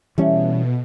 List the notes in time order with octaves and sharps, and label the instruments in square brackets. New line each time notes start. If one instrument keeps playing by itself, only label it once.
[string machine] B2 [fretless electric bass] E3 G3 C#4 [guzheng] A3